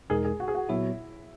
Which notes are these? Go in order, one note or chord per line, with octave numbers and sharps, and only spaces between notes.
E2 B2 G#3 D#4 G#4 A#4
G#4
F#4
G#4
F#4
A#2 F#3 B3 E4 F#4 C#5